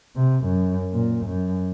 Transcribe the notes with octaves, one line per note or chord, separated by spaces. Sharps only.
C3
F#2
A#2
F#2